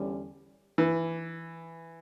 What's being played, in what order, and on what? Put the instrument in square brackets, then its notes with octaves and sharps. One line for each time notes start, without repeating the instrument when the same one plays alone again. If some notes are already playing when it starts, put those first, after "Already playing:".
Already playing: [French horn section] E2 D3 G3 C#4
[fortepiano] E3